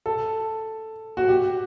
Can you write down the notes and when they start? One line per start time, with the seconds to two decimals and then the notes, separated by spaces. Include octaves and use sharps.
0.06 A4
1.17 F#4
1.29 G4